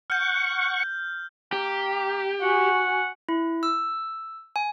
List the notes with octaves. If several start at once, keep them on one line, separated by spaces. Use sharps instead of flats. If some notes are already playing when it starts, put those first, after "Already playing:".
F#5 C#6 F6 G6
A#3 G4
F#4 F#5 G#5
E4
E6
G#5